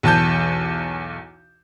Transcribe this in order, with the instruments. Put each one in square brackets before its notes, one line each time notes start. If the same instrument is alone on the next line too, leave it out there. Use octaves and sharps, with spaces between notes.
[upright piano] B1 E2 A5 G6